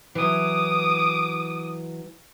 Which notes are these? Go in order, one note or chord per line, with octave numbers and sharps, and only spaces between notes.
E3 F#3 D6 D#6